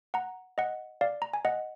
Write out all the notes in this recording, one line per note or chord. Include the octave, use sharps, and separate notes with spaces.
F#5 A#5
D#5 F#5
D5 F5
A#5
G#5
D#5 F#5